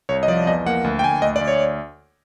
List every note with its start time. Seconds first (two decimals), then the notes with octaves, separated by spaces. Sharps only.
0.09 C2 C#5
0.23 D#5
0.28 F3 D5
0.47 E2 D#5
0.66 A#3 F#5
0.84 D2
0.99 G5
1.04 D2 G#5
1.22 D2 D#5
1.36 D5
1.41 D2
1.48 C#5